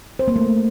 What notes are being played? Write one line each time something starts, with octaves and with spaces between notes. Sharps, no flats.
C5
A#3
A3